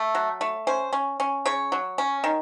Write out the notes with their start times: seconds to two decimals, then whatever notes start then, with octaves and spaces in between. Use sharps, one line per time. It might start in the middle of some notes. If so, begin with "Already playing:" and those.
Already playing: A3
0.15 F#3
0.41 A3
0.67 C#4 C5
0.93 C#4
1.20 C#4
1.45 C#3 C#5
1.72 F#3
1.98 C#4
2.24 D#3